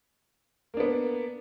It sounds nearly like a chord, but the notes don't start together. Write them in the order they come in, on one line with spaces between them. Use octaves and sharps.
A#3 D4 B3